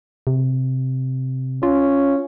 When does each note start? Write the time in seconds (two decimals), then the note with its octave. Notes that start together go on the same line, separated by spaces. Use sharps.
0.27 C3
1.63 C#4 F4